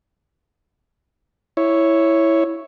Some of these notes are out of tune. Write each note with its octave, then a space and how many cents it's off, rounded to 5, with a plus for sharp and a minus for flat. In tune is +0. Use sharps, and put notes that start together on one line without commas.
E4 +0 C#5 +0